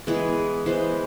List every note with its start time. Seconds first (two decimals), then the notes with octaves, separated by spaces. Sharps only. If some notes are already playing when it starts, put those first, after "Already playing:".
0.07 E3 G#3 B3 G#4
0.66 E3 G#3 B3 C5